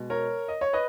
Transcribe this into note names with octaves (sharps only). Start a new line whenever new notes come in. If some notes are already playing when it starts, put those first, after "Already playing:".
Already playing: B2 G#3
A#4 C#5
D#5
C#5
B4 D#5